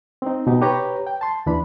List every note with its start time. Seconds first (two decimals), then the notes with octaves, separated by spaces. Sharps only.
0.22 C4 D#4
0.47 B2 D#4 G4
0.62 G4 B4 C#5 A#5
1.07 G5
1.21 A5 C6
1.46 D#2 E3 D4 B5